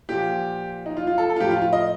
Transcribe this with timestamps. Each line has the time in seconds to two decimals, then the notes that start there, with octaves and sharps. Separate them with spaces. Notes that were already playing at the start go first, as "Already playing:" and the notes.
0.09 A#2 F3 G4
0.86 D#4
0.97 F4
1.07 F4
1.18 A4
1.30 A4
1.36 F4
1.40 A2 F3 G4
1.51 F4
1.61 F4
1.73 D#5